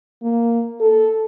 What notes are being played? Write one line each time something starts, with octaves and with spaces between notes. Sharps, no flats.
A#3
A4